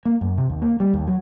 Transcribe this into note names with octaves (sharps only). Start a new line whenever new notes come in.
A#3
F#2
C3
D#2
A#3
G3
D#2
F#3